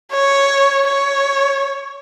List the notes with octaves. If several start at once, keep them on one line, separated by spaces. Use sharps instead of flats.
C#5
C#5